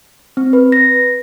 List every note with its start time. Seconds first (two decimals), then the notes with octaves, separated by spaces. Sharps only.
0.37 C4
0.53 B4
0.72 A#6